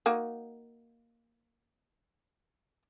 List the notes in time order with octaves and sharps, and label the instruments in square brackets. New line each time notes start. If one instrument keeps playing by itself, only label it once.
[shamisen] A#3 D#4 F#4